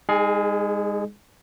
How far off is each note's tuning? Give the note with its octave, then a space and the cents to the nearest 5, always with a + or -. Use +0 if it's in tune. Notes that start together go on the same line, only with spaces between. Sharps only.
G#3 -30 D#4 +0 G#4 +20